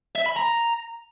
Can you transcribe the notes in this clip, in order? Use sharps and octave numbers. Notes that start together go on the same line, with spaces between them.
E5
B5
A#5